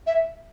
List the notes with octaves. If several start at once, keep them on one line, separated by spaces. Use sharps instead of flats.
E5